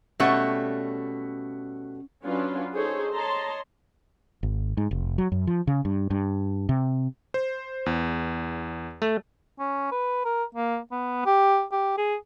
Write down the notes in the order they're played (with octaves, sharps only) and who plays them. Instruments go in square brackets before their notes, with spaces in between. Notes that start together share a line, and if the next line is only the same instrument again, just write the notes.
[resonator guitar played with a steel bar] B2 G3 A3 [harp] C#4 [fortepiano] E5 F#5 C#6
[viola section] F#3 C#4 D4 F4 B4
D#4 G#4 A4 C5 C#5
C#5 D#5 A5 A#5 C6
[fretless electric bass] G#1
G#2
F1
F#3
F#2
F3
C#3
G2
G2
C3
[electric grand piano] C5
E2
[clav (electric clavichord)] A3
[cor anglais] C#4
B4
A#4
A#3
B3
G4
G4
G#4